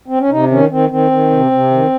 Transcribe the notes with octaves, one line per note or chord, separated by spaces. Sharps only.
C4
C#4
C3 D#4
D#3 C#4
D#3 C4
D#3 C4
D#3
C3
C3
D#3